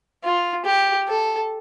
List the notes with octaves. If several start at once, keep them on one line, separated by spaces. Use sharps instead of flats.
F4
G4
A4